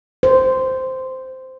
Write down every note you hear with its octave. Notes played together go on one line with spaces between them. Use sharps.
C5